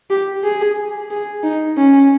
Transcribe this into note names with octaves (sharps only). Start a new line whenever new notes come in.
G4
G#4
G#4
D#4
C#4